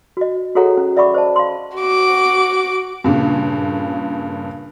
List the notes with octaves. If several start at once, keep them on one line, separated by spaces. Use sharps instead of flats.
F#4 D#5
F#4 G#4 A4 C#5 F#5 A#5
C#4
D5 E5 F#5 B5 C#6 D6
C5 D#5 A5
F5 C6
F#4 D6
G2 A#2 C#3